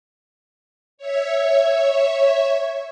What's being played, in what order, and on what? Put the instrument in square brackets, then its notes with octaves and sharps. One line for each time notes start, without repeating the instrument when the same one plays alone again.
[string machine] C#5 E5